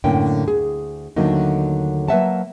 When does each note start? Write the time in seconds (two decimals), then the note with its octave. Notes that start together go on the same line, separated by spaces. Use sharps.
0.04 F#2 A2 D3 A#3 C#4 G5
0.46 D2 G#4
1.16 D#2 D3 F#3 A3 A#3 D#4
2.08 F#3 A#3 B4 E5 F#5 A5